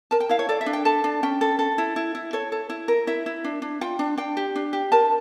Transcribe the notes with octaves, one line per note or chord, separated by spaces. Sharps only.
A#4 A5
G5
E4 F5
C#5
A4 D5
E5
D4
G5
A4 A5
D4
C#4 G5
A4
A4
E4
E4
E4
A4 C#5
A4
E4
A#4
E4 E5
E4
D4
D4
F4 G5
D4
D4 G5
G4
D4
G4
A#4 A5